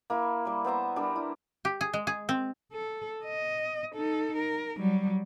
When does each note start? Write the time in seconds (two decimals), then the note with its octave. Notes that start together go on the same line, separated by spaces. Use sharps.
0.10 A#3 E4 E5
0.45 G3 A#3
0.64 B3 C5 E5 A#5
0.96 G3 D4 A#4
1.16 E4
1.65 G4
1.81 G#4
1.93 G#3
2.07 G#4
2.29 C4
2.73 A4
3.24 D#5
3.95 D#4 A4
4.36 A#4
4.78 F#3 G3